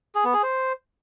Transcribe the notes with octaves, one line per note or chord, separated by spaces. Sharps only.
G#4
B3
G#4
C5